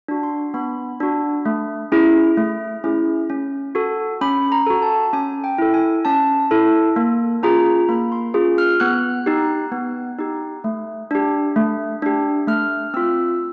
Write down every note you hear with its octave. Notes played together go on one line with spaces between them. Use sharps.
D4 F#4
C6
B3 B5
D4 F#4
A3
C#4 E4 G#4
A3
C#4 E4 G#4
C#4
F#4 A4
C#4 B5
A#5
F#4 A4
A5
C#4 G#5
G5
E4 A4
G#5
C#4 A5
E4 A4
A#3
C#4 F4 G#4 A#5
A#3 B5
C6
C#4 F4 G#4
F6
B3 F#6
D#4 G4
B3
D#4 G4
A3
D4 G4
A3
D4 G4
A3 F6
C4 F4 E6